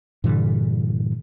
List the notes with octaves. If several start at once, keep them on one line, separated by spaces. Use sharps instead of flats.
G2 A#2 D3 E3 G3